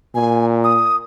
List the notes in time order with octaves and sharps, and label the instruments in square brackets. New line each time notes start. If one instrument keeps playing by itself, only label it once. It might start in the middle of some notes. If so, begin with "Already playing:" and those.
[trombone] A#2 [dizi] G#5
[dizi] D#6